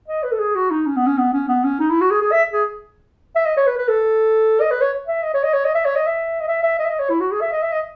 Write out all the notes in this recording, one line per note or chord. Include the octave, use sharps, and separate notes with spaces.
D#5
B4
A4
G#4
F#4
D#4
C#4
B3
C#4
B3
C#4
B3
C#4
D#4
E4
F#4
G#4
G#4
E5
G#4
E5
D#5
C#5
B4
B4
A4
D#5
B4
C#5
E5
D#5
C#5
D#5
C#5
D#5
E5
C#5
D#5
E5
D#5
E5
E5
D#5
E5
D#5
C#5
E4
F#4
G#4
E5
D#5
E5
D#5